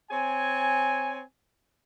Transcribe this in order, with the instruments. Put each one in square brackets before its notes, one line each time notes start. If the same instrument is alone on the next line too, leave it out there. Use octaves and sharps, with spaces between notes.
[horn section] C4 C#5 G#5